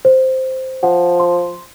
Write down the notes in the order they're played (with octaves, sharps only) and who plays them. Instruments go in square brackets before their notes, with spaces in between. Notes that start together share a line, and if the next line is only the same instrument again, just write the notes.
[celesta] C5
[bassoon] F3 [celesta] F#5
[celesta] C6